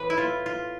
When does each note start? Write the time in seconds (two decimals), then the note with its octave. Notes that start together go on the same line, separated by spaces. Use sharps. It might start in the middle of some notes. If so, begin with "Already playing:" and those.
Already playing: A2 E3 B3 B4
0.10 E4
0.18 F4
0.46 F4